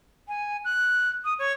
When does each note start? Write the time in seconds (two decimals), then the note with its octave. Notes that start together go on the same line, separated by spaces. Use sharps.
0.27 G#5
0.64 F#6
1.24 D#6
1.38 C#5